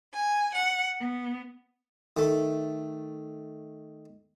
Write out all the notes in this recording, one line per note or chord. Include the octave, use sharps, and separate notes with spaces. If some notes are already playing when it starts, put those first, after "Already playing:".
G#5
F#5
B3
D#3 A3